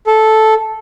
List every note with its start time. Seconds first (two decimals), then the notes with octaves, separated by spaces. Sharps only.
0.07 A4